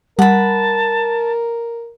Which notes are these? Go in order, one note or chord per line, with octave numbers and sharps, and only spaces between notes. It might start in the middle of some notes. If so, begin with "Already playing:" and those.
G3 A#4 F#5 A5 B5